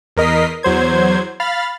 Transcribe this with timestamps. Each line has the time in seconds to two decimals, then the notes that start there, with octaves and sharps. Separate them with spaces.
0.17 E2 A#4 D#5 B6 C7
0.63 E2 F#3 C5 G#6
1.40 F5 B5 F6 A6